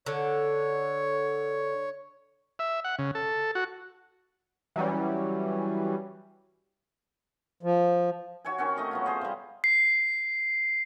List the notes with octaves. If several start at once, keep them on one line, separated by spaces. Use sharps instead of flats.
D3 C#5
E5
F#5
C#3
A4
F#4
E3 F#3 G3 C#4
F3
F#4 C#5 E5 G#5
D#3 C4 C#4 F#4
A3 D#5 C#6
F#3 B3 F4
G#4 C5 D#5 F5
C3 G3
C7